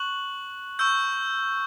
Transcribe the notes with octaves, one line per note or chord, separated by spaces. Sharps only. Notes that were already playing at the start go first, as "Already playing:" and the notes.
Already playing: C#6 F#6 F#7
C#6 E6 G6